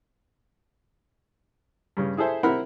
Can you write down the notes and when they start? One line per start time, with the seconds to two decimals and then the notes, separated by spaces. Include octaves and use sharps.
1.97 G2 C#3
2.17 E4 G#4 A4 C5 E5
2.43 C4 E4 A#4 F#5 B5